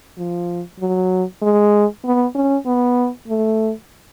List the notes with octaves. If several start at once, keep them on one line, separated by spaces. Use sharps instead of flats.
F3
F#3
G#3
B3
C#4
B3
A3